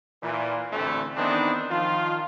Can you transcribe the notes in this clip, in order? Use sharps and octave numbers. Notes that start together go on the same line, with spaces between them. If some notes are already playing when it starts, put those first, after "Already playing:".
A#2 E3
A1 D2 D3 E3 A3 C4
D#3 E3 B3 C4 D4 D#4
D#3 F3 F4